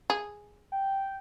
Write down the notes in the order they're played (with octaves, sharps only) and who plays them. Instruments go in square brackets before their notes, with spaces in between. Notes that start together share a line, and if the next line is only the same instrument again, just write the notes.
[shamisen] G#4
[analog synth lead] G5